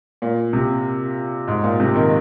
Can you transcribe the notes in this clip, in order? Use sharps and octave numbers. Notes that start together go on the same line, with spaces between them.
A#2
C3
G#2
A#2
C3
D#3